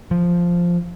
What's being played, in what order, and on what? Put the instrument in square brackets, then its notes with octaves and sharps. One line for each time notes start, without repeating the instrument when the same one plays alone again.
[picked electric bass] F3